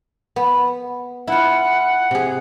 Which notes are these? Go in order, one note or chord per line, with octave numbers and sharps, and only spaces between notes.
B3
E4 F4 F#5
C3 G#4